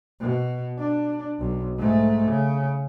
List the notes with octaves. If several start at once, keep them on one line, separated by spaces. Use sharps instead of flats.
B2
D4
B1
G#2 A3
C#3